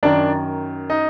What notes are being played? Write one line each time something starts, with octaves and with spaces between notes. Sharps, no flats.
F#2 D#3 D4 D5
D#4 D#5